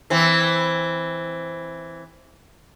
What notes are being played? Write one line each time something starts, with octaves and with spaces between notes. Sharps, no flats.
E3 C4